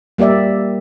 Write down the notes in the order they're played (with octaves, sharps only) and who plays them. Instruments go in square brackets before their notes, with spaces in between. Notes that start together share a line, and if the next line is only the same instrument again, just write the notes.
[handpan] G3 A#3 G4 D5 E5